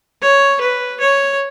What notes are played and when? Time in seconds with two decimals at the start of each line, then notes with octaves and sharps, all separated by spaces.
0.22 C#5
0.61 B4
1.00 C#5